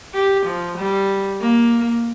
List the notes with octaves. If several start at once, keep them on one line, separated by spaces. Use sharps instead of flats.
G4
F3
G3
A#3